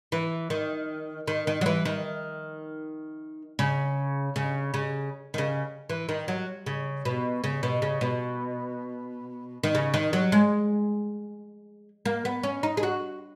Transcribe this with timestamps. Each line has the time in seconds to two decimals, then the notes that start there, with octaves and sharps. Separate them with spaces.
0.12 E3
0.50 D#3
1.27 D#3
1.47 D#3
1.61 F#3
1.66 E3
1.85 D#3
3.59 C#3
4.36 C#3
4.74 C#3
5.34 D#3
5.38 C#3
5.90 E3
6.09 D#3
6.28 F#3
6.66 C#3
7.05 B2
7.44 C#3
7.63 B2
7.82 C#3
8.01 B2
9.64 D#3
9.75 C#3
9.94 D#3
10.13 F#3
10.32 G#3
12.05 A#3
12.25 B3
12.43 C#4
12.63 D#4
12.77 G#4
12.83 F#4